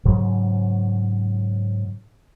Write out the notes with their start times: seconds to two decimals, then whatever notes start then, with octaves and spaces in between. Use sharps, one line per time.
0.05 G#2 C#3 F#3